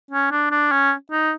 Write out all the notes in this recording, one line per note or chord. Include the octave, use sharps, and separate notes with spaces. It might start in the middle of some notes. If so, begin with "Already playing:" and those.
C#4
D4
D4
C#4
D#4